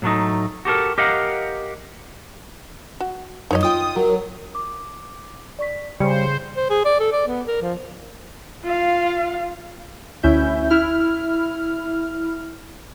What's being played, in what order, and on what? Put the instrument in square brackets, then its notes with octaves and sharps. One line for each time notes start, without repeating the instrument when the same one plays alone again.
[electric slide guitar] A2 F#3 A3 D#4
F#4 G4 A4 A#4
G4 A#4 D#5 F5 F#5
[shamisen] F#4
[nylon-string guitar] F#2 F#3 [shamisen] D#4 C#5 D#5
[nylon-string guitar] F4 G5 [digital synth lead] D#6
[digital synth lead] F#3 [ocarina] A#4
[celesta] D6
D5 C#6 B6
[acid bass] C#3 [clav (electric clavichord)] G3 [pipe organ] C5 [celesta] C#7
[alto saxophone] C5
G#4
D5
A4
D5
B3
A#4
F3
[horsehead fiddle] F4 F5
[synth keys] D2 C#4 E4 E5 G6
E4 F6